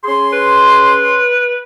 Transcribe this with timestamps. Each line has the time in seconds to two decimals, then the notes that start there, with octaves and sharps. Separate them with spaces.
0.05 C#4 G#4 C6
0.33 B4